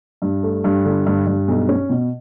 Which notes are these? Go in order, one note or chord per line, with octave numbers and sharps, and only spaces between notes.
G2
A3
G2
D3
G2
G2
B1
C#4
B2